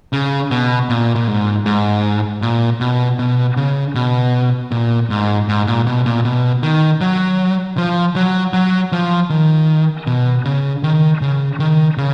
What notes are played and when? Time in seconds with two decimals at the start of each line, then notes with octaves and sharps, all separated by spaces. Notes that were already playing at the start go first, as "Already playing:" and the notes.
0.13 C#3
0.51 B2
0.90 A#2
1.15 A#2
1.28 G#2
1.66 G#2
2.42 A#2
2.81 B2
3.19 B2
3.57 C#3
3.95 B2
4.71 A#2
5.10 G#2
5.48 G#2
5.67 A#2
5.87 B2
6.06 A#2
6.25 B2
6.63 D#3
7.01 F#3
7.77 F3
8.16 F#3
8.53 F#3
8.92 F3
9.30 D#3
10.07 B2
10.45 C#3
10.83 D#3
11.21 C#3
11.60 D#3
11.98 C#3